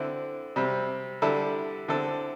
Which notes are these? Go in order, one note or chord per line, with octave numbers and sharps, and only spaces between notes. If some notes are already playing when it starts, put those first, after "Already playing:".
Already playing: D3 C4 E4
C3 G3 C4
D3 G3 E4 A4
D3 C4 E4 A4